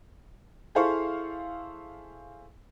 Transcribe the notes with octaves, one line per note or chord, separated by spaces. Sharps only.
E4 G#4 A4 C5 F5 C#6